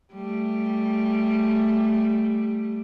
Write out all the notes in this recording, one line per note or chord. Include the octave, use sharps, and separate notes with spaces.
G3 A3